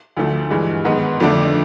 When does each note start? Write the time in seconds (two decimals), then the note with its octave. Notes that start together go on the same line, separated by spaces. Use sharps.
0.17 D2 D3 F3 A3
0.50 G2 E3 G#3
0.85 G#2 D#3 G#3 B3 D#4
1.20 F2 D3 F3 A3 D4